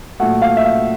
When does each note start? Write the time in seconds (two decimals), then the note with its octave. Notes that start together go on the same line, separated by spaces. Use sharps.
0.20 A#2 F#3 A3 F#5
0.42 F5
0.57 E5
0.64 F5